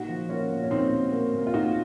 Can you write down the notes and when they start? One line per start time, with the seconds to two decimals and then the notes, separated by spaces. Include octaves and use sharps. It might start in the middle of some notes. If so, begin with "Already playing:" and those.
Already playing: A#2 D#4 F#4
0.09 F3
0.29 A#3 C#4 F4
0.50 A#2
0.64 C#4
0.71 A#2 C4 D#4
0.92 A#2
1.12 A#3
1.34 A#2
1.47 F4
1.54 A#2 D#4 F#4